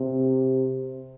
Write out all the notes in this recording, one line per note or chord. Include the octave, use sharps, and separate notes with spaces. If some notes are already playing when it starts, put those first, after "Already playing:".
Already playing: C3